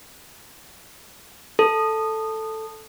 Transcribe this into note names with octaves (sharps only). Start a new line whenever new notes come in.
A4